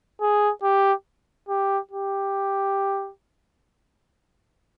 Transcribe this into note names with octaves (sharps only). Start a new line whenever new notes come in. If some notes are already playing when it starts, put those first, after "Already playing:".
G#4
G4
G4
G4